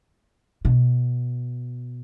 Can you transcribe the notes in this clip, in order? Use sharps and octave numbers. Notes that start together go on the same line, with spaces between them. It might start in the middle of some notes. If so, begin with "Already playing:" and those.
B2